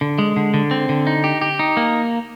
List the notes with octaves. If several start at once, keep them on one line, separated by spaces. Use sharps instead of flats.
D3
G#3
D3
D3
C4
D3
D#4
G4
G4
D#4
A#3